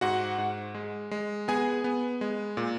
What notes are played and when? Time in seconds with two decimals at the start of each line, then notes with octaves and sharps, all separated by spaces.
0.01 G#2 F#4 F#5
0.38 G#2
0.75 G#3
1.11 G#3
1.48 B3 G#4 G#5
1.84 B3
2.21 G#3
2.57 A#2